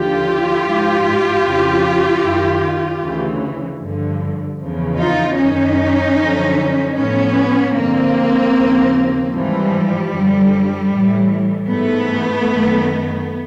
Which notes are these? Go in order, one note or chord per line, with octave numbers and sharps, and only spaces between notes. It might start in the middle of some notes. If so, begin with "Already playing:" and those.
Already playing: D#2 D3 F3 F4 G4
G#2 F3
F2 C#3 F3
F#2 D#3
D2 C#3 E3
G2 D3 F3
E2 C#3 F3
D#4 F4
F#2 D#3 C#4 D#4
F#2 D3 F3
A2 F3 B3 C#4
G2 D3 F3 A#3 C4
D#2 C#3 F3
G#2 E3 F3 G3
F#2 D3 F3
A2 E3
G#2 E3 A3 B3
F#2 D#3